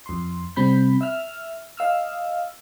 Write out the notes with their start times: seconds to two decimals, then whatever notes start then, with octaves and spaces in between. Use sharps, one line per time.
0.06 F2 C6
0.56 C3 G3 C4 B5 G6
1.01 E5 E6 F6
1.77 D#5 F5 E6 F6